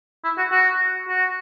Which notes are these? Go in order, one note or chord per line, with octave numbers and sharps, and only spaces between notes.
E4
F#4
F#4
F#4